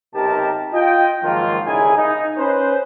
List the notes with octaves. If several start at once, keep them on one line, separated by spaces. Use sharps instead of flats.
B1 C3 D#4 G4 A#4 A5
F4 D#5 G5
G#2 D#3 F3 F#3 A#3 F4
C2 C#3 D#4 E4 G#4 G#5
D#4
C#4 B4 C5